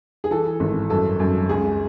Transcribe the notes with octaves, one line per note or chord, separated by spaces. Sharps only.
G#4
E3 A4
G#1
F#2 A4
F#2
C#2 G#4